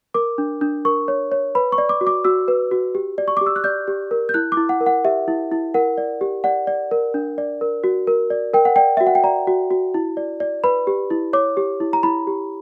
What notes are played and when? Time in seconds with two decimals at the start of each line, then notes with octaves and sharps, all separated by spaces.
0.14 A#4 D6
0.38 D4
0.61 D4
0.85 A#4 C#6
1.08 C#5
1.32 C#5
1.55 B4 B5
1.72 C#6
1.78 D5
1.89 D6
2.01 F#4
2.07 D6
2.24 F#4 E6
2.48 B4
2.71 F#4
2.95 G4
3.18 D5
3.28 C#6
3.37 D6
3.41 G4
3.47 E6
3.56 F#6
3.64 D5 G6
3.88 G4
4.11 A#4
4.29 G6
4.34 E4 F#6
4.52 D6
4.57 E4
4.69 F#5
4.80 A#4
4.86 F#5
5.04 G4 E5
5.28 E4
5.52 E4
5.74 A#4 F#5
5.98 D5
6.21 G4
6.44 D5 F#5
6.67 D5
6.91 A#4
7.14 D4
7.38 D5
7.61 A#4
7.84 F#4
8.07 A#4
8.30 D5
8.54 A#4 G5
8.65 F#5
8.76 D5 G5
8.97 F#4 E5
9.07 F#5
9.15 G5
9.24 D5 A#5
9.47 F#4
9.71 F#4
9.94 E4
10.17 D5
10.40 D5
10.64 B4 B5
10.87 G4
11.10 E4
11.33 C#5 D6
11.57 G4
11.80 E4
11.93 A#5
12.03 E4 B5
12.27 G4